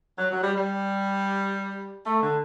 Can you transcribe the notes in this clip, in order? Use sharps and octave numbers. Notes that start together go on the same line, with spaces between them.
F#3
F#3
G3
G3
A3
D3